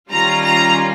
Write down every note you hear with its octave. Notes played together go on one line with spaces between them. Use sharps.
D#3 G3 C#4 F4 A#5
A#5